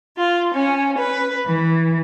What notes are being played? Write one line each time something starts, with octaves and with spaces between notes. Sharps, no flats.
F4
C#4
B4
E3